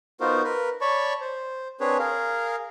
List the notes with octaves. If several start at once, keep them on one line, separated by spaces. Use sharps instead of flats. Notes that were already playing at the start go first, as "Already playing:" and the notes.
B3 D#4 F4 F#4 A#4 C5
A#4 B4
C#5 D5 A5 B5 C#6
C5
C4 D4 G#4 B4 C#5
G#4 A#4 F5